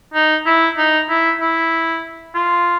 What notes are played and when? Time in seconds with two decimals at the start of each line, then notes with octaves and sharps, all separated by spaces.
0.14 D#4
0.46 E4
0.78 D#4
1.09 E4
1.41 E4
2.35 F4